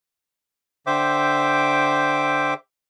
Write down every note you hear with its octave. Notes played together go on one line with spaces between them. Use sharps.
D3 C5 E5 G5 D6